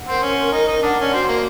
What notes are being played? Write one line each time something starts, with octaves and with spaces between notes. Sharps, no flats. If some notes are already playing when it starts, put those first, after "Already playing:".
Already playing: F#5
C4 A#4
C#4 A#4
A#4
D#4 A#4
D#4 A#4
D4 F#5
C#4 D5
C4 F#4
A#3 A#4